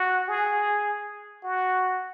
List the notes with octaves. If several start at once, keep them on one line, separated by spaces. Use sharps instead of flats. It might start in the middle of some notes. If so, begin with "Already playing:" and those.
Already playing: F#4
G#4
F#4